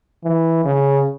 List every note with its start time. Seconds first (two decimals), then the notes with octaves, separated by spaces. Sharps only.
0.24 E3
0.65 C#3